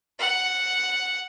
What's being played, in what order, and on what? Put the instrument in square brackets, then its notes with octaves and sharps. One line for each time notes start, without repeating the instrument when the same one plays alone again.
[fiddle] F#5